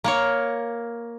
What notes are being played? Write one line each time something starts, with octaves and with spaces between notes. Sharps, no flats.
A#3 A#4 C#5